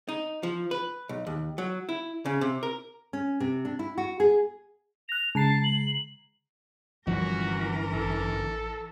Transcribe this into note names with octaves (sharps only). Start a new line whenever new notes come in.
D#4
F3
B4
B1
D#2
F#3
E4
C#3
C3
A#4
C#4
C3
D4
E4
F#4
G#4
F#6 A#6 F7
C#3 G#3 A5 A#5 C7
F#7
G1 F#2 E3 F3 F#4 A#4
A1 A4